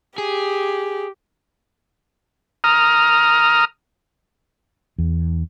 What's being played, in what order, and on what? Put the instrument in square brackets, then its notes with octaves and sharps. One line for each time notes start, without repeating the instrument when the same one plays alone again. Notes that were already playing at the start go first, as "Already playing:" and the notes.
[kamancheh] G4 [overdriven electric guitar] G#4
[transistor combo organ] A#5 D#6 F6
[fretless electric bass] E2